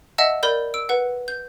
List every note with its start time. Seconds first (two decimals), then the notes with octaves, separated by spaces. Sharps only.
0.18 D#5 E5 F#5 A5 E6
0.43 A#4 D5 B5 G6
0.74 E6 D7
0.89 B4 F#5
1.28 G6